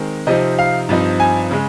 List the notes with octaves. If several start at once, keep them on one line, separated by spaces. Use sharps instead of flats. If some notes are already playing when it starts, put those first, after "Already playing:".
Already playing: D#3 G#3 C4
C3 F3 C4 D#4 D#5
F5
G2 F3 C4 D#4
G#5
C#3 G#3